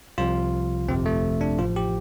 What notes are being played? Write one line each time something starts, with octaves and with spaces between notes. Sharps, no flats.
C2 C3 F3 F4
G1 F2 C3 F3 C4
A3
D4
A1 A2 F3 F4
G4